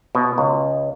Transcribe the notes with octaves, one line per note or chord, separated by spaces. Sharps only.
B2
C#2